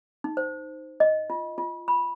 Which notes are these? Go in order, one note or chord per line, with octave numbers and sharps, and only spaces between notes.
D#4
C5
D#5
F4
F4
B5